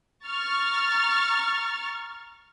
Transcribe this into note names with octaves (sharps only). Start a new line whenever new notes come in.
A#5 C#6 F6 A6